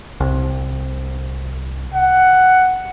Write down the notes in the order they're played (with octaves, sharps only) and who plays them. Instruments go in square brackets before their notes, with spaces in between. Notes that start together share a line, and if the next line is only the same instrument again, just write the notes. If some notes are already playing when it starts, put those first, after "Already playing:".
[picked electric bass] C2
[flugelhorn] F#5